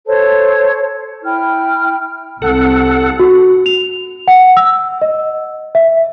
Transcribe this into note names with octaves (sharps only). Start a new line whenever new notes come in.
A4 C5 C#5 A5
E4 G5 F6
C2 A4 F#5
F#4
F7
F#5
E6
D#5
E5